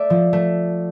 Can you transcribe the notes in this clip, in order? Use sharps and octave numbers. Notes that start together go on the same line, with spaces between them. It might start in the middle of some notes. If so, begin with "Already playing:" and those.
Already playing: A3 D5 E5
F3
A3